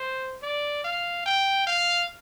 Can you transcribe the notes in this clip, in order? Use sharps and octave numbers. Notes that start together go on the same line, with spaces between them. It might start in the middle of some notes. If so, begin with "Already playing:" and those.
Already playing: C5
D5
F5
G5
F5